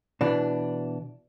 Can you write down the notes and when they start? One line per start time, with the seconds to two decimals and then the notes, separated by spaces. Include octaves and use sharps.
0.21 B2 E3 D4